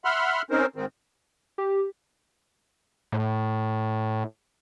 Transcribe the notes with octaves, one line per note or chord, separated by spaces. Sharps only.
E5 F#5 B5 C6 F6
C4 C#4 D#4 A#4 C5
G#2 D#3 C4
G4
A2